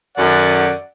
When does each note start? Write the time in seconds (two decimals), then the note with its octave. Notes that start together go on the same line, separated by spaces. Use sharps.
0.18 F#2 D5 F#5